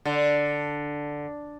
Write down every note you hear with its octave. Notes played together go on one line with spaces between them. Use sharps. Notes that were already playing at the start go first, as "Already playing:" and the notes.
D3